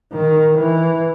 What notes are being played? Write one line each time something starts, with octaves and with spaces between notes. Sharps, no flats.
D#3
E3